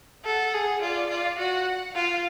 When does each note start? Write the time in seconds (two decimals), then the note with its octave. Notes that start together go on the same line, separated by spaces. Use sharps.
0.25 A4 F#5
0.54 G#4
0.81 F4 D5
1.10 F4
1.38 F#4 F#5
1.94 F4 F5